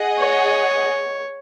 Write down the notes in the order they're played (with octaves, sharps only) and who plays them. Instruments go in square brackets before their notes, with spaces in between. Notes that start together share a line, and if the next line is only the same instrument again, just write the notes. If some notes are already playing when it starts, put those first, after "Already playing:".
Already playing: [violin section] G#4 D#5 F#5
[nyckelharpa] C#5